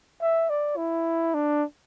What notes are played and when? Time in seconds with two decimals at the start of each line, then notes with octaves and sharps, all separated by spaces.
0.21 E5
0.50 D5
0.77 E4
1.34 D4